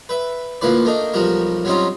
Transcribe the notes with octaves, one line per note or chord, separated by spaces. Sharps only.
B4 E5
D2 A#2 F3 E4 B4 D5
A3 A#3 D4 D#4
B1 F3 G3 F#4 G4 A#4
F#3 G3 C4 C#4 D#4 F4